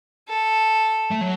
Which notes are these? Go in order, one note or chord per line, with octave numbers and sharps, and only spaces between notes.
A4
A3
F#3